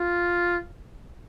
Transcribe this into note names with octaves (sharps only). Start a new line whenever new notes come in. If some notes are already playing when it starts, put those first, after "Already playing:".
Already playing: F4